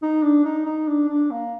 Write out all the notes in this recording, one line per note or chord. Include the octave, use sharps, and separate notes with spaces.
D#4
D4
D#4
D#4
D4
D4
A#3